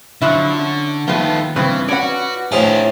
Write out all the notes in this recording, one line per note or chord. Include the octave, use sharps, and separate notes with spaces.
D3 F3 F#3 E4
C#4
D#2 D#3 F3 A3 B3 F4
G2 C#3 E3 C4 B4
C#4 F#4 B4 D5 F#5
A2 F3 D4 E4 G#4